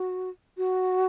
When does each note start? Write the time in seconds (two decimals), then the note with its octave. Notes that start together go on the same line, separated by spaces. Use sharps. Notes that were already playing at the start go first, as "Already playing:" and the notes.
Already playing: F#4
0.58 F#4